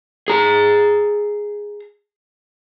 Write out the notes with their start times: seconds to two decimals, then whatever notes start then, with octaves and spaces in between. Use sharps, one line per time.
0.28 G#4 A#5